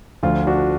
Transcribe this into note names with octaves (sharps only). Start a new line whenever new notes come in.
D2 D3 F3 F4
D4 F#4